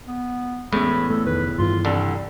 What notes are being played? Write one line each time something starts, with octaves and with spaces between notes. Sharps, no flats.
B3
E2 A2 G#3 C#4 B5
A3 A4
F1 D#3 B4
G2 D#3 E3 F4
C2 D3 A4